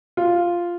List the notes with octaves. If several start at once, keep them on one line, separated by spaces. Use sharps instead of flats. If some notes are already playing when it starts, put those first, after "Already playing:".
F4